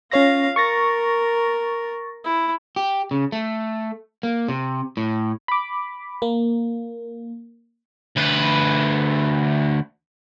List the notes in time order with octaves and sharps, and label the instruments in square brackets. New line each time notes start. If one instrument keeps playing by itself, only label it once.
[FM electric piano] C#4 C#5 A#6 [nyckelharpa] F4 F5
[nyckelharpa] A#4 [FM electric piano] C#6 A6 A#6
[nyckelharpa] E4
[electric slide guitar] G4
C#3
A3
A#3
C3
A2
[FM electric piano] B5 D6
A#3
[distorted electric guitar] D2 B4